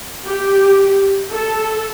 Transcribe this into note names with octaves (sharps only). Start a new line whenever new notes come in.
G4
A4